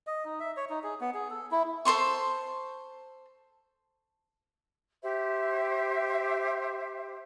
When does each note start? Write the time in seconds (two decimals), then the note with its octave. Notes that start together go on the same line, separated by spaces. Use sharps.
0.07 D#5
0.25 D#4
0.40 E5
0.57 C#5
0.69 D#4
0.84 G#4
1.01 B3
1.14 G#4
1.30 A4
1.51 E4
1.85 A4 C5 C6 C#6
5.03 G4 C5 E5